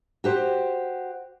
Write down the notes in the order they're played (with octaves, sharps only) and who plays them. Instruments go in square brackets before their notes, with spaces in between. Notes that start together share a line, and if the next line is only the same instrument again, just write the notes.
[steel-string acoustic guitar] F#4 G4 C5